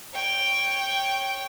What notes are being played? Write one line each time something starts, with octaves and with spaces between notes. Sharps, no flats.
C#5 G5